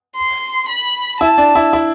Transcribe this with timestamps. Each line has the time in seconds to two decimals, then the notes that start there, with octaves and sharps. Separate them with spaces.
0.17 C6
0.69 B5
1.20 E4 A5
1.38 D4
1.55 E4
1.73 E4